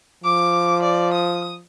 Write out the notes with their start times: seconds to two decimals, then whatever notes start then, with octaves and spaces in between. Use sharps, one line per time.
0.24 F3 D6
0.83 D5
1.13 D#6